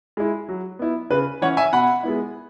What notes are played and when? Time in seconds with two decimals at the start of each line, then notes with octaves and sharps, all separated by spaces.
0.17 G#3 E4
0.48 F#3
0.79 B3 E4
1.10 C#3 B4
1.42 E3 C#4 C#5 F#5
1.57 E5 G#5
1.73 B2 F#5 B5
2.03 G#3 B3 E4